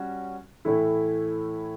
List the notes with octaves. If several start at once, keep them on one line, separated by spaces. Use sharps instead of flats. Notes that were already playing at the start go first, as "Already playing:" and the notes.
Already playing: G3 C#4 F#4
A2 E3 A3 E4